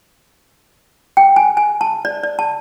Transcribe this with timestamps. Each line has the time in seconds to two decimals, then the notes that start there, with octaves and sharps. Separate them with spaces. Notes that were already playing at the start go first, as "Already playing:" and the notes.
1.17 G5
1.36 G#5
1.57 G#5
1.81 A5
2.05 D5
2.23 D5
2.39 A5